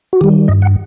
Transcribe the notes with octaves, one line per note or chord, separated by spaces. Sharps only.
F#4
D#3 G3 G4
G2 D#5
F#5